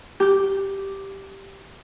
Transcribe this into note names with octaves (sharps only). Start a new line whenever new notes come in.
G4 G6